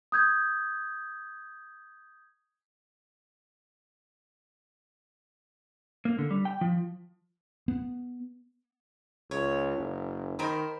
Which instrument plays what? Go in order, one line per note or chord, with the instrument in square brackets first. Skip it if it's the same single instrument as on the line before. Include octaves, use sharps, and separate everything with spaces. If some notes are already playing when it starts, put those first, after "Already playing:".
[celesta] D#6 G6 G#6
[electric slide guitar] A#3
D3
G3
G5
F3
[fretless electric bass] B3
[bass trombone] C#2 [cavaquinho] C#5
[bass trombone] F#1
[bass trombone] D#3 [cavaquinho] A#4 C5 B5